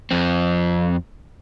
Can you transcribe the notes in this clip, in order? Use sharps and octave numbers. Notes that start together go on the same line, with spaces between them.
F2 C4